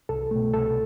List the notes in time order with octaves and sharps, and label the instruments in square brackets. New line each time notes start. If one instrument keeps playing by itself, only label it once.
[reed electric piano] C2 A4
B2 A3
C2 A4